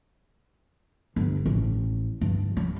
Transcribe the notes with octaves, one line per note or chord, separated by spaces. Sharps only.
G1
A1
G2
G3